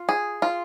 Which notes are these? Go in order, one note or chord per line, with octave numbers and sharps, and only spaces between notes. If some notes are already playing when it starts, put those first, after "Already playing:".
Already playing: F4
G#4
F4